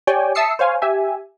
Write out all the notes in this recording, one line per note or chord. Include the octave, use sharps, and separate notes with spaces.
G4 C#5 D5 G5 G#5
E5 A5 D#6 E6 C7 C#7
C5 C#5 F5 G#5
G4 E5 G#5